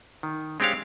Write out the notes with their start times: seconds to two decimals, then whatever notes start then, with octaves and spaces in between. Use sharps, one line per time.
0.23 D#3
0.60 G#3 C4 D4 G4 C#5 F5